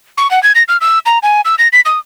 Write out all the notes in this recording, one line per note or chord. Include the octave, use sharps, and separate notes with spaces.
C#6
F#5
G#6
A#6
F6
E6
A#5
G#5
E6
A#6
B6
D#6